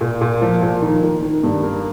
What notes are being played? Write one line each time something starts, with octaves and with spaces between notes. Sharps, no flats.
A#2
A#2
F3
A#2
D#3
D#3
D#3
G2
A#3